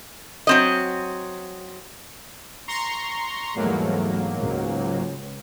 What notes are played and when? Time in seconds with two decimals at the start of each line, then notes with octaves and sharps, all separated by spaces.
0.47 F#3 C4 D#5
2.68 A#5 C6 C#6
3.56 E2 G#2 F#3 G3 A3 A#3
4.36 C#2